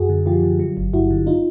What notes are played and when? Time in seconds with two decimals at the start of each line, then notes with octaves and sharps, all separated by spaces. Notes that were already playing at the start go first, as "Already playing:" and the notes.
Already playing: F#2 F#4 G#4
0.09 D3
0.26 F3 F4 G4
0.43 D3
0.59 F#3
0.77 G1
0.93 G2 E4 F#4
1.11 D3
1.27 D#4 F4